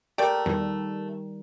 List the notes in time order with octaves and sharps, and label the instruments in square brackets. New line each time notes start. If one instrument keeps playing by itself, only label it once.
[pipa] A3 D5 G5 [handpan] G4 A#4
[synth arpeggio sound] E2 [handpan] D#3 G3